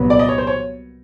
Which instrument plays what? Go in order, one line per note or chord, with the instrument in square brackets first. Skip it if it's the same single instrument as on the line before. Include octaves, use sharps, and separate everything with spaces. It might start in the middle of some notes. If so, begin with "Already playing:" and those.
Already playing: [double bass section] C2 A#2 F#3 B3
[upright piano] D5
D#5
C#5
C5
C#5